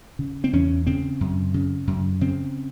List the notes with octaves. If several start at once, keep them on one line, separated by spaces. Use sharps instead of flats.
C#3
C4
E2 C#4
C#3 C4
F#2
C#3
F#2
C#3 C4